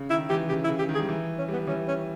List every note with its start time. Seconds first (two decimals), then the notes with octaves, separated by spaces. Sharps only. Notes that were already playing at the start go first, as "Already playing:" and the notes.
Already playing: C#3
0.10 D#3 E4
0.29 E3 G4
0.49 C#3 G4
0.64 E4
0.69 C#3
0.79 G4
0.89 D#3
0.94 G#4
1.00 G3
1.09 E3
1.38 C#4
1.48 G3 B3
1.67 E3 C#4
1.88 C#4